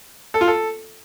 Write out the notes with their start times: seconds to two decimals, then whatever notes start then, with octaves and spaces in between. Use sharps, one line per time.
0.34 A4
0.41 F4
0.48 A4